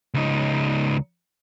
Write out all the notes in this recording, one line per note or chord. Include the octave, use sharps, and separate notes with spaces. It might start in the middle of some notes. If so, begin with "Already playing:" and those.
C#2 D#4